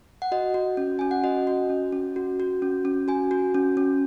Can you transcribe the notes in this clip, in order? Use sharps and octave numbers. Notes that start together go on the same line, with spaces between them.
F#5
F#4 D#5
F#4
C#4
C#4 G#5
F#5
F#4 D#5
F#4
C#4
C#4
F#4
F#4
C#4
C#4
F#4 G#5
F#4
C#4
C#4